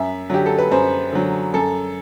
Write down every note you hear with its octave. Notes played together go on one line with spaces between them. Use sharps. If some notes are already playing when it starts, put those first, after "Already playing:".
Already playing: F#2 E5
D3 F#3 G4
A4
B4
F#2 C5
D3 F#3
F#2 A4